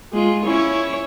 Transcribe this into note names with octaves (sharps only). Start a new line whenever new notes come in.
G#3 F4
C#4 E4 C#5